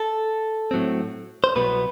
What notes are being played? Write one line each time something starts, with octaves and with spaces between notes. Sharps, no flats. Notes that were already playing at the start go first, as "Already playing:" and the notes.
Already playing: A4
A2 F#3 C4
C5
C2 B2 F#3 B3 B4